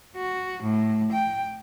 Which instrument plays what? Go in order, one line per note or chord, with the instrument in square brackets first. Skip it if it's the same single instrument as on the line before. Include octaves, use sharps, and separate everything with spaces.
[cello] F#4
A2
G5